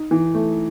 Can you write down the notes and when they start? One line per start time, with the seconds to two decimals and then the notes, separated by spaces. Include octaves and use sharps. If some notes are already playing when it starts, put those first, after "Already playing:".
Already playing: D#4
0.11 E3
0.35 A3